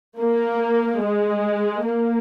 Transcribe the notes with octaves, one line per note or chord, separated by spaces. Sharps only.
A#3
G#3
A#3